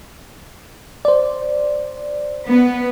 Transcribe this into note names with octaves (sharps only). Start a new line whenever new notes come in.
C5 D5
B3